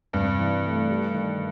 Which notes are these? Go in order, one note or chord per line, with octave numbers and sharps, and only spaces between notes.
G2 C3
E3
A3
G4
D#3